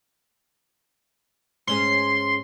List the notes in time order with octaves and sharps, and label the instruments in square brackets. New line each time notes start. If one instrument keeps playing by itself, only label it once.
[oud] G#2 C#4 G#4 [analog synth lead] C6